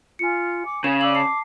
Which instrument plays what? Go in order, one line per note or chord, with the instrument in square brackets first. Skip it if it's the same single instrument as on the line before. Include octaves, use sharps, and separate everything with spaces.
[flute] F4 [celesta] G#5 C#7
[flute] D6
[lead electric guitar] C#3 [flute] G#5 [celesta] G#6 E7
[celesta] D5 E6 F#7 [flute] D6
[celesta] A5 C7